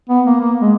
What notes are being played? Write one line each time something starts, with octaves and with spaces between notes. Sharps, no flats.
B3
A#3
A#3
G#3